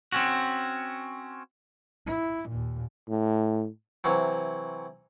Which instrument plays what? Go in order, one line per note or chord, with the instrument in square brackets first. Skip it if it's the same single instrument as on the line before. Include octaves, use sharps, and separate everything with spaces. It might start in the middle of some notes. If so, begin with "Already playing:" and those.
[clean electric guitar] C4 C#4 F#4
[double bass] E4
D#2 A#2
[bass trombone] A2
[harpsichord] C3 E3 F#3